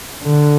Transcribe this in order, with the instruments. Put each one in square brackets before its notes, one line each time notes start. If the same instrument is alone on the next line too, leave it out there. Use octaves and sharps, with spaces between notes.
[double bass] D3